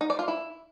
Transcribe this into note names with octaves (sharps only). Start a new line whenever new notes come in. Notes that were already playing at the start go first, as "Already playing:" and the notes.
D#4
D5
F4
E4